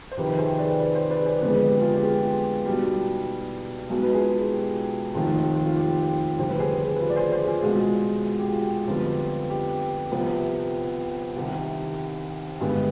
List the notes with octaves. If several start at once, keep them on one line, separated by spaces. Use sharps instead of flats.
C5
F2 C3 D#3 G4 B4
G#4 C5
B4 D5
B4 D5
G#4 C5
B4 D5
G#4 C5
F2 D3 G#3 B3 B4
G#4
G4
F4 G#4
G4
F4 G#4
B1 B2 G3
B1 B2 G#3 G#4
B4
F4 G#4
G4
F1 D#2 D#3 F4
F4
G4
F1 D#2 D3 G3 C5
B4
G#4 C5
B4
F4 G#4
D5
G#4 C5
G#4 C5
F4 G#4
C2 B2 G#3 F4 G#4
G#4
G4
F4
G4
F2 D3 G3 B3 F4
G4
C2 C3 F3 B3
C2 C3 D#3 G4
G2 D3 G#3 B3 G#4
B4